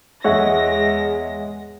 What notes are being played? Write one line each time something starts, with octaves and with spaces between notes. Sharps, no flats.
E2 G#3 G#4 C#5 E5 F#5 A#6